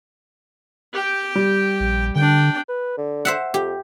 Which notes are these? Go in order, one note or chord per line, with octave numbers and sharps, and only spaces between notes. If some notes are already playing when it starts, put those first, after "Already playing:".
G4 G5
G3
A#1
D3 D4 G5
B4
D3
C5 E5 F#5
F2 G4